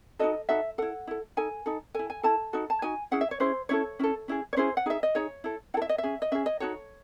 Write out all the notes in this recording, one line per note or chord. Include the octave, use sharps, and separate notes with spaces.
D#4 F#4 A4 D#5
D#4 F#4 A4 E5
E4 A4 F#5
E4 A4
D#4 A4 G#5
D#4 A4
E4 A4 G#5
G#5
E4 A4 A5
D#4 F#4 A4
A5
D#4 F#4 G#5
C#4 E4 G#4 F#5
E5
C#5
C#4 E4 G#4 C5
C#4 E4 A4 C#5
C#4 E4 A4
C#4 E4 G#4
C#5
C#4 E4 G#4 C5
F#5
D#4 G#4 E5
D#5
D#4 G#4 C#5
E4 A4
E4 A4 F#5
E5
D#5
E5
C#4 G#4
D#5
C#4 G#4 E5
D#5
D#4 F#4 A4 C#5